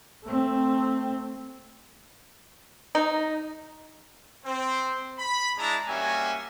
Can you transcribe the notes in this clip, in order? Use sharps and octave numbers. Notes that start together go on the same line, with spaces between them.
A3 C4
D#4
C4 C5
B5
G#3 D4 E4 A5 A#5
G3 A#3 C#4 F#4 E5 G#5